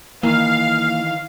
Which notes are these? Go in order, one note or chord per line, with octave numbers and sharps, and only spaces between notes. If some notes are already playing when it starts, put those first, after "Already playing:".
D#3 E3 A#3 F5